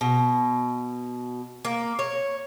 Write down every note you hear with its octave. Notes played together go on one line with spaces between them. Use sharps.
B2
A#3
C#5